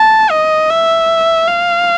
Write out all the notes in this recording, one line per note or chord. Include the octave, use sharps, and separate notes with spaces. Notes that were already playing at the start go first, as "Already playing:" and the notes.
Already playing: A5
D#5
E5
F5